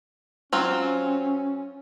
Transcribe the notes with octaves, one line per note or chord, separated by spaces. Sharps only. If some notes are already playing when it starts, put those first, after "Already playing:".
F#3 C4 C#4 F4